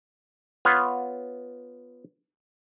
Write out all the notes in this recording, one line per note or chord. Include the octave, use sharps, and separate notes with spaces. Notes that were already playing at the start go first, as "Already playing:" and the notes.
B3 F4 C#5